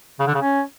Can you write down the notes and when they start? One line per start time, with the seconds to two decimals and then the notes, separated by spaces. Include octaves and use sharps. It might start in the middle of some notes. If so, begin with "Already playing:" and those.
0.19 C#3
0.27 D3
0.34 C#3
0.41 C#4